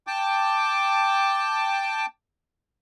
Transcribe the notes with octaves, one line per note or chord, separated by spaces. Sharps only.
G5 A5 D6